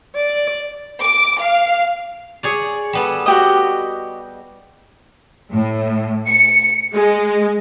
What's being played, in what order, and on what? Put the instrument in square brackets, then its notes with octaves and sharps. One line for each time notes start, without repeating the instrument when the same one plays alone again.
[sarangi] D5
[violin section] D6
F5
[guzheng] G#4 C#5 D5
G3 B3 A4
[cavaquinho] F#4 G4 D#5
[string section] A2
C#7
G#3